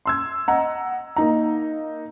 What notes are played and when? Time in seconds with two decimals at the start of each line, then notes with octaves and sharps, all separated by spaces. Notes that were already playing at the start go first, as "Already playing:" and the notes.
0.06 C6 E6 G#6
0.48 D#5 F#5 A#5
1.16 A#3 D#4 A#5